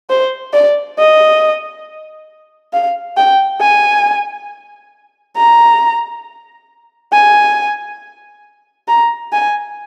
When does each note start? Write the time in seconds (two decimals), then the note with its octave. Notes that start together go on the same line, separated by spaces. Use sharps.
0.10 C5
0.54 D5
0.99 D#5
2.73 F5
3.17 G5
3.62 G#5
5.37 A#5
7.13 G#5
8.88 A#5
9.33 G#5